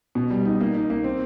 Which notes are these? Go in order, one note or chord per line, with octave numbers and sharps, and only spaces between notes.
B2
G3
D#4
A#3
D#4
A#3
C4